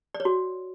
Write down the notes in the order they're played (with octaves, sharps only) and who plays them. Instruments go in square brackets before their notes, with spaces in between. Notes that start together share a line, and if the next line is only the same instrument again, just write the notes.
[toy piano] D5
C#5
F#4